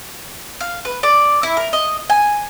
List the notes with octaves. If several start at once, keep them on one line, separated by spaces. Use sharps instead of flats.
F5
B4
D5
E4
A#4
D#5
G#5